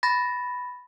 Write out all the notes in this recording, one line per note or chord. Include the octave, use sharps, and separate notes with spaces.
B5 A6 A#6